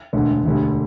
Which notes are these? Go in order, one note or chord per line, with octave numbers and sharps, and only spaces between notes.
E1 D2 D3 B3
E1 D2 D3 G3